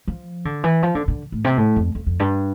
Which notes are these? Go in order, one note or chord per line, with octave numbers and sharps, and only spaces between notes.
F3
D3
E3
F3
D3
D3
A2
C3
A2
F2
F2
F2
G2